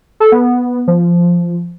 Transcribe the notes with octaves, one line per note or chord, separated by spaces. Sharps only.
A4
B3
F3